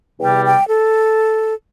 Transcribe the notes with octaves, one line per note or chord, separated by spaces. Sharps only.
E2 C3 G3 G5
G5
A4